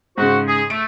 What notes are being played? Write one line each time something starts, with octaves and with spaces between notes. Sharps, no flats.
G#2 C#3 F#4 C5 F#5
G#4
A3 D7